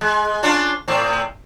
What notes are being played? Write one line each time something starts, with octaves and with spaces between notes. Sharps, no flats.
G#3
C#4 D4 F4
A2 C4